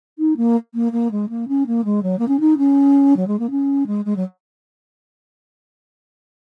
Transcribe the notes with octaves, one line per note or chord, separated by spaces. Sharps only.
D#4
A#3
A#3
A#3
G#3
A#3
C#4
A#3
G#3
F#3
A#3
C#4
D#4
C#4
F#3
G#3
A#3
C#4
G#3
G#3
F#3